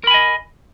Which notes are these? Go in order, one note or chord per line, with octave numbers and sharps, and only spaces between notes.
A#4 D#5 G#5 B5